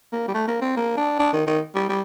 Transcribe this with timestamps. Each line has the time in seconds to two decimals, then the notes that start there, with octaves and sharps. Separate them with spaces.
0.12 A#3
0.28 G3
0.34 A3
0.48 A#3
0.62 C4
0.76 A#3
0.97 D4
1.19 D4
1.33 D#3
1.47 D#3
1.75 G3
1.89 G3